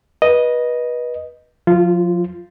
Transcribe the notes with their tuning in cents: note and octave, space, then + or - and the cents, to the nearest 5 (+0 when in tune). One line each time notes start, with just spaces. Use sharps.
B4 -25 D#5 +0
F3 +35 F4 -15